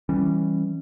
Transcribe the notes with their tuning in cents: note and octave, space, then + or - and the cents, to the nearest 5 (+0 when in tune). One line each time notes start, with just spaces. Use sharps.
E3 +0 G3 +0 C#4 -15